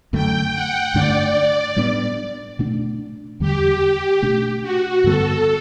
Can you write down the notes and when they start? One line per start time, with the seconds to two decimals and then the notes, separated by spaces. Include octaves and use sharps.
0.13 F#2 D3 A3 G5
0.54 F#5
0.94 G2 D3 A3 D4 D5
1.76 A2 G3 B3 D4
2.59 B2 A3 D4
3.40 E2 D3 G3 G4
4.22 B2 A3 D4
4.63 F#4
5.04 G2 D3 G3 B3 A4